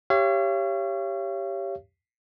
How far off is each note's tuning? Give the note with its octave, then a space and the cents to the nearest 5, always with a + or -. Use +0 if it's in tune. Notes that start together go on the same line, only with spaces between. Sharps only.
G4 +0 C#5 +0 F5 -45